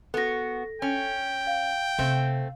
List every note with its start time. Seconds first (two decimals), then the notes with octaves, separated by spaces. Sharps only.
0.14 B3 F#4 A4 A#6
0.82 C#4 G5
1.47 F5
1.99 C3 A3 C4